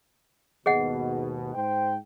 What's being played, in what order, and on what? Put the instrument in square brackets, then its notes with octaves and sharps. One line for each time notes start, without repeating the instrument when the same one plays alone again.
[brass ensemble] D#2 G#2 B2 [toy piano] G#4 D#5 F#5
[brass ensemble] G#2 C5 G5